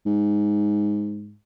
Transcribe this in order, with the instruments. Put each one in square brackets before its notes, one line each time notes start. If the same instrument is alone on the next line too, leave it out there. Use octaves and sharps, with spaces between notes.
[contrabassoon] G#2